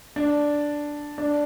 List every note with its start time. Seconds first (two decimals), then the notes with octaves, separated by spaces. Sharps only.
0.16 D4
1.18 D4